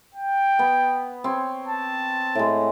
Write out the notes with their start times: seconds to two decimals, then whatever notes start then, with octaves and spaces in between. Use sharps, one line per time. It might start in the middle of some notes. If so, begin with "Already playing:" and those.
0.15 G5
0.59 B3
1.24 C4 C#5
1.68 A5
2.35 A2 G#3